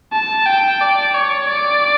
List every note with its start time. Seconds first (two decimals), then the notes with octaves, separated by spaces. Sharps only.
0.13 A5
0.46 G5
0.81 D5
1.14 C#5
1.48 D5